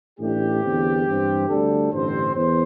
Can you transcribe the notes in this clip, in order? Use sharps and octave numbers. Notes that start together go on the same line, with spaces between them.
A1 A2 A3 D4 G4
E2 D3 C4
G2 E3 C4
D2 D3 G3 A4
A1 G2 D3 G3 C4 C5
E2 C5